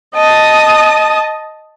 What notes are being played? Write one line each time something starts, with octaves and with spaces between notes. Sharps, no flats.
D#5 A5 D#6